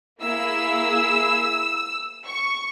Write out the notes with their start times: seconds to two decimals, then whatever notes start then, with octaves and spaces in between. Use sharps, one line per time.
0.21 A#3 E4 G#4 E6
2.25 C#6